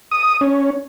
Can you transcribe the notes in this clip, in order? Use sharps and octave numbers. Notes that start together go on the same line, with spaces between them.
D#6
C#4